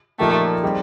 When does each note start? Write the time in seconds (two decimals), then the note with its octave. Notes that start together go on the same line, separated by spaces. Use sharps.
0.19 A#2 F3 A3 A#3 D#4 G4
0.63 G3 C4 D#4 G#4